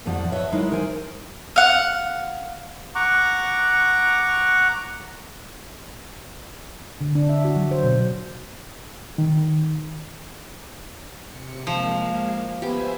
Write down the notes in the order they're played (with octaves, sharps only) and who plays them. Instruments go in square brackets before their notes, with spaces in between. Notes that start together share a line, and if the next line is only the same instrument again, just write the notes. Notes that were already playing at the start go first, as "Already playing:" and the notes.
[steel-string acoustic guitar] F2 A2 F3 G4 D5 F#5
B4 C#5 D#5 E5
F#3 G#3 D#4 E4 A#4
A#4 C5 G#5
[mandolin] F5 F#5
[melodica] F#5 A#5 C#6 D6
[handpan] D3
D4
E5
F#4
F#3
C5
B2
[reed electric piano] D#3
[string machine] C3 C#7
[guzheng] F3 [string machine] G#3 A#3 F5
[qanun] B3 G4 [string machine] C5 E5 G#5